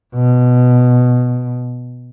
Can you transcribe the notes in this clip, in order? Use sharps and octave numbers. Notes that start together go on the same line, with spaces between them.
B2